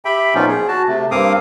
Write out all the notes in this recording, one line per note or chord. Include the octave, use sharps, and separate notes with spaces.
G4 E5 G5 B5
A#2 F3 B3 C#4 D#4 F4
G#4
F#4 A5
C3 A3
G2 A#3 C4 F5 D6 D#6